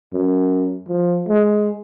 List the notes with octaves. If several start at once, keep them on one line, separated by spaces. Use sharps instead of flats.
F#2
F3
G#3